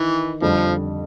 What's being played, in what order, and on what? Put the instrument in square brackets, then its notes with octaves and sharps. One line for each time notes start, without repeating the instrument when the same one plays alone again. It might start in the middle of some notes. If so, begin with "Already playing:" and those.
Already playing: [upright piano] D#3 [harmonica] E3
[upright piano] F2 D3 G3 [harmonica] F3